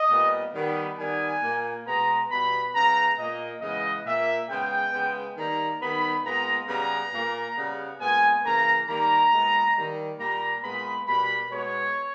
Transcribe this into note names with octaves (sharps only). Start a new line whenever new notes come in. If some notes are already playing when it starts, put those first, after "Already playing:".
Already playing: D#5
A#2 G3 B3
D#3 G3 B3
D#3 G3 B3 G#5
A#2 A#3
B2 G#3 B3 A#5
B2 G3 B3 B5
C#3 G#3 B3 A#5
A#2 A#3 D#5
C#3 E3 G#3 B3 D#5
A#2 A#3 E5
C#3 G#3 B3 G5
C#3 G#3 B3
D#3 G3 A#3 A#5
D#3 G3 B3 B5
A#2 G#3 B3 A#5
C#3 G3 B3 A#5
A#2 A#3
C#3 G3 B3
A#2 G#3 B3 G#5
C#3 E3 A#3 A#5
D#3 G3 A#3 A#5
A#2 G#3 B3
D#3 G3 A#3
A#2 G3 A#3 A#5
A#2 G#3 B3 B5
B2 G3 A#3 B5
B2 G#3 B3 C#5